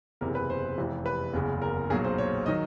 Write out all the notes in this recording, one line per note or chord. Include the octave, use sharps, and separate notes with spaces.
F#1 E2 C3 E3 A#4
B4
C5
F1 F2 C3 E3
B4
F#1 E2 C#3
A#4
B1 A#2 F#3 G#4
C5
C#5
D#3 F#3 D#5